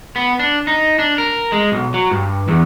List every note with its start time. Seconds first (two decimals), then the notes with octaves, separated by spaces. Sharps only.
0.16 B3
0.39 D4
0.67 D#4
0.99 D4
1.18 A#4
1.52 G#3
1.72 B1
1.94 F#3
2.11 G2
2.48 E2